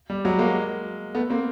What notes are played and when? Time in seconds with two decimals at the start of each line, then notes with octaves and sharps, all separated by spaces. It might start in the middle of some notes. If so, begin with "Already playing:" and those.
0.10 G3
0.24 F#3 G#3
0.39 G#3 A#3
1.15 A3 B3
1.30 A#3 C4